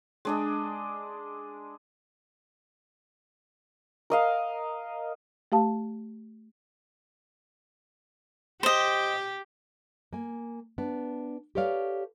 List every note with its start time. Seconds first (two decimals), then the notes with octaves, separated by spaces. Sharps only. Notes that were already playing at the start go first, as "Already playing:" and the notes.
0.25 G#3 D4 D#5
4.10 A#4 D#5 F5
5.52 A3 G4 F5 A5
8.63 G4 C5 D#5
10.13 A#3 G#5
10.78 B3 D4
11.55 G4 A4 B4 C#5 D5 F5